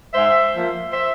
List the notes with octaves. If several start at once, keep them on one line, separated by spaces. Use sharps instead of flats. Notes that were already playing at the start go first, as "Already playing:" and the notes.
G#2 C5 E5
F3 A#3
C5 E5